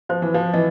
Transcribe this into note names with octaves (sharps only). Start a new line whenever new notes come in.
F3 C5
E3
F3
E3 D#5